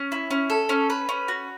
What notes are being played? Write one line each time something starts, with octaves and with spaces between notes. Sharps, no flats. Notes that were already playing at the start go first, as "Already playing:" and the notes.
Already playing: C#4
E4
C#4
A4
C#4
B4
C#4
F#4